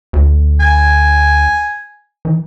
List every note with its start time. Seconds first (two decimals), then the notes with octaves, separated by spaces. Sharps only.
0.13 D2
0.60 G#5
2.25 E3